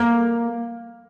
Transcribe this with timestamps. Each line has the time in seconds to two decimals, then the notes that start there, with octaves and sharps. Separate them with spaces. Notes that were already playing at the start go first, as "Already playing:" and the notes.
Already playing: A#3